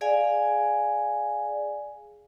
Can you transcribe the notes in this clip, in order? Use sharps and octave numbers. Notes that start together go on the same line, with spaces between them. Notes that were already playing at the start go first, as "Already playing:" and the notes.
G#4 D5 F5 G#5